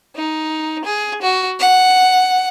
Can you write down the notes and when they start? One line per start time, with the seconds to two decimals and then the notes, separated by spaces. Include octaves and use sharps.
0.16 D#4
0.85 G#4
1.22 F#4
1.60 F#5